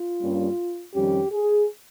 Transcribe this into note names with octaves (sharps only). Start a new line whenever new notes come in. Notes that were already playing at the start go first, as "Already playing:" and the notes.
Already playing: F4
G2 G3 A#3 C#4
F2 D#3 G3 C#4 G4
G#4